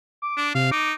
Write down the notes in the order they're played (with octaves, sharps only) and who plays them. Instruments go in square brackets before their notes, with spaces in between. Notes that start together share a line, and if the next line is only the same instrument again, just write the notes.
[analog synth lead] D6
[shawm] D4
[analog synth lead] C3 [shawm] F5
[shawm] D#4 [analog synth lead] D6